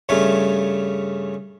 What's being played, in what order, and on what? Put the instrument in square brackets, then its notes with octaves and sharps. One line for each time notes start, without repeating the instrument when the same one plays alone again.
[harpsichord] G2 C#3 A3 C#4